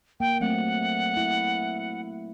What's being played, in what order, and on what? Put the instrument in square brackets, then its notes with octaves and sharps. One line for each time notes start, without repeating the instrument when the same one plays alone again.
[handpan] A#3 [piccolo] G5
[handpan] F#3 A3 C4 [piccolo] F#5
[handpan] E4